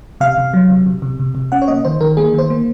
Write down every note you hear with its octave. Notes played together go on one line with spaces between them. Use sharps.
C3 F5
C3
F#3
C3
C3
C3
C3
C3
C#4 F#5
C#5
A#3 D#5
D#3 C5
D#3 A#4
A#3 G#4
D#3 C5
A#3